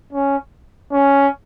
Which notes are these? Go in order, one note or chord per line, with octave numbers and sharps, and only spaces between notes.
C#4
C#4